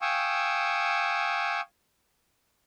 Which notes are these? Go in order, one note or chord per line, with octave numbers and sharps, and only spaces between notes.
F5 G5 G#5 C#6 D#6 E6